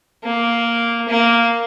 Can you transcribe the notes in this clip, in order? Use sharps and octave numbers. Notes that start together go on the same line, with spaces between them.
A#3
A#3